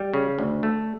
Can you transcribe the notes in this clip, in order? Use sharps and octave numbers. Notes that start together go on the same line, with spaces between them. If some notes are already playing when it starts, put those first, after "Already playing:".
Already playing: G3
C#3
D2
A3